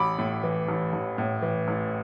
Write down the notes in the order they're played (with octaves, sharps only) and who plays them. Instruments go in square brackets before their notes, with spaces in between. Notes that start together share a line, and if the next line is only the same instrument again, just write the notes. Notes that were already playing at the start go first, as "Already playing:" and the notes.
Already playing: [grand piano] A1 B5 D6
A2
E3
A1
A1
A2
E3
A1